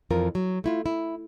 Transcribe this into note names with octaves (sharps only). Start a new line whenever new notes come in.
F2 E3 F4 A#4
F#3
A3 E4 F4
E4